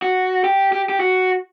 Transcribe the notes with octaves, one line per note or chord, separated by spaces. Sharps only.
F#4
G4
G4
G4
F#4